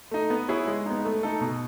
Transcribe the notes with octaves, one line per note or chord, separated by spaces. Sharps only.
A3 D#4
B3
E4 G#4 C#5
G#3
B3 D#4
A3
D#4 A4
B2